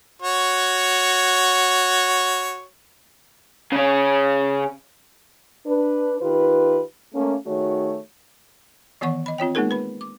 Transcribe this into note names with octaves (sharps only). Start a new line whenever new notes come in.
F#4 C#5
C#3 C#4
D4 B4
D#3 F4 G4 B4
A3 A#3 C#4
D#3 A3 F#4 G#4 C#5
D#3 E3 B3 C#5 F#5 C#6
D#5 B5
C4 F4 C#5 G5
G#3 A#3 B3 D#4 G#4 A#4
B4 B5
D6